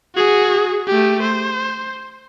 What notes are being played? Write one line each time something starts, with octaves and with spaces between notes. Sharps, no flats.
F#4 G#4
A3 G4
C5